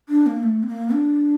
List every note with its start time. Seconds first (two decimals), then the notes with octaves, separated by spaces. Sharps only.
0.09 D4
0.26 A#3
0.43 A3
0.63 C4
0.67 A#3
0.93 D4